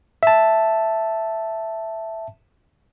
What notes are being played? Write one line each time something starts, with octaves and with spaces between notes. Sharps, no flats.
E5 A5